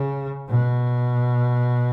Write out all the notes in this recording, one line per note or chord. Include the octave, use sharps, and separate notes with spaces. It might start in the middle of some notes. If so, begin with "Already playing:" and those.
Already playing: C#3
B2